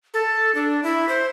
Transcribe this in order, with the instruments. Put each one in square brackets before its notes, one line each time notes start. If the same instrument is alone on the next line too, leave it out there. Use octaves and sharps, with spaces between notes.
[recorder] A4
D4
E4
C5